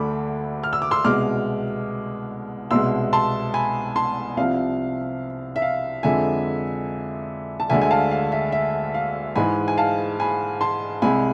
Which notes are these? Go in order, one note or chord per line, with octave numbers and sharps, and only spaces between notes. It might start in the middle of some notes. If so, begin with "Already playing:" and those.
Already playing: D2 D3 A3 B5 D6
F6
E6
D6
C6 E6
C2 B2 G#3 D6 F6
C2 B2 G#3 C6 E6
A5 C6
G#5 B5
A5 C6
C2 C3 F3 F5
E5
F5
F2 D3 G#3 E5 G#5
A5
D2 D3 G#3 E5 G#5
G#5
F5 A5
F5
E5
E5
F5
G#2 E3 G#3 G#5 B5
G#5
F5 A5
G#5 B5
A5 C6
C2 C3 G#3 G#5 B5